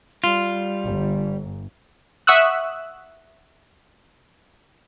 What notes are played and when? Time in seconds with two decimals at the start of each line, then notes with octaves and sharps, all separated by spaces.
0.24 G3 F4
0.86 G1
2.27 E5 F#5 C#6 D#6 E6 F#6